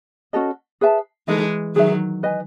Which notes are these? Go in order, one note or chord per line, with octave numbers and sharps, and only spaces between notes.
C#4 F#4 A4 D#5
G#4 B4 E5 A5
E3 G#3 D#4 A4 D#5
D#3 F#3 G#4 B4 E5
B4 D#5 G#5